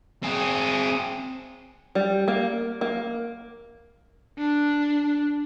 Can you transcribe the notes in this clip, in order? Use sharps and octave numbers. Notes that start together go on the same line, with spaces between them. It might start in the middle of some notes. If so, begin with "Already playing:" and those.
C4 G#4
G3
A#3
A#3
D4